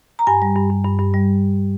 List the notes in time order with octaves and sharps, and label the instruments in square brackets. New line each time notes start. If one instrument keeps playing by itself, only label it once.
[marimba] A#5
G2 G#5
G3
G2
G2
G2
G2
G3